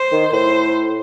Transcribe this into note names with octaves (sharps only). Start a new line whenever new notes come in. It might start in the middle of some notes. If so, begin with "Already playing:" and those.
Already playing: C5
D#3
A2 C5